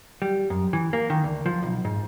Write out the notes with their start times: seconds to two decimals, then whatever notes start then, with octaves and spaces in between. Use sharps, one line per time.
0.22 G3
0.50 F#2
0.73 E3
0.93 A#3
1.10 D#3
1.24 D2
1.46 F3
1.63 B1
1.85 G#2